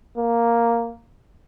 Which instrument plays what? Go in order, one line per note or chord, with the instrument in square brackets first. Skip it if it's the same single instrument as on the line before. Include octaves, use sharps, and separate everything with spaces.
[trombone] A#3